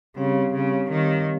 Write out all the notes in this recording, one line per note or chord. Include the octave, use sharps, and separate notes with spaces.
C#3 G3 C4 G4 C#5 F5
C#3
D#3